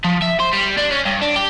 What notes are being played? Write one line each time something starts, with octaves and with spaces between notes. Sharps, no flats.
F3
E5
C5
G3
D4
C#4
G2
D4
G4